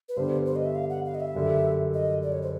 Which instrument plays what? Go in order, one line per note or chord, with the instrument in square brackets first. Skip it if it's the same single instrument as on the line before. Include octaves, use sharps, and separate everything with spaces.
[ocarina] B4
[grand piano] G2 D3 G3 B3 D4 [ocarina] C5
[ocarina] C5
D#5
E5
F5
F#5
F5
D#5
E5
[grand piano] F#2 D3 G3
[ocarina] D#5
D5
C#5
C5